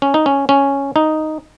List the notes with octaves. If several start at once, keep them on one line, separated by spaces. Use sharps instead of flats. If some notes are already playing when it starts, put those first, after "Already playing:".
C#4
D#4
C#4
C#4
D#4